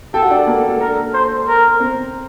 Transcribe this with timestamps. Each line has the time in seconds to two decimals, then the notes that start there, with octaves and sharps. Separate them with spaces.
0.14 G4 A4 G5
0.22 F#4 F#5
0.31 D4 D5
0.39 A4
0.47 A#3 A#4
0.58 A4
0.69 A4
0.80 A4 A#4
1.14 C5
1.48 A#4
1.80 C4 C5